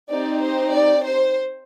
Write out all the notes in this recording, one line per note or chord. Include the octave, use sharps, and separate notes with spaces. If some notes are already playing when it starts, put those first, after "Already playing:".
C4 D#4 G4 D5
C5
D5
C5